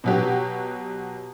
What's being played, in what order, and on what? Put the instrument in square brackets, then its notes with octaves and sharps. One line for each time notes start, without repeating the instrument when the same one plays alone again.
[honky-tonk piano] B2 F#3 G4